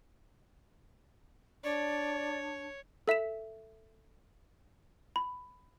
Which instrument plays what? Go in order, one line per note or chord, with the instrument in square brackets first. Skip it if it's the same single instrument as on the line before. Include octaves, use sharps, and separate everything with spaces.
[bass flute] D4 [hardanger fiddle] C#5 [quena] D5
[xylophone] A4 E5 B6 E7
B5